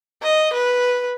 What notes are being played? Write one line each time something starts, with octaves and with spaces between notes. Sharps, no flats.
D#5
B4